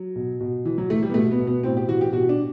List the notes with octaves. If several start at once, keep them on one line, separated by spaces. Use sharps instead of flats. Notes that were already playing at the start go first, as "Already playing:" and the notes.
Already playing: F#3
B2
B2
E3
F#3
E3 A3
G3
B3
B2 A3
B3
B2
B3
A2 C4
G4
E3 F#4
G4
B2 F#4
D4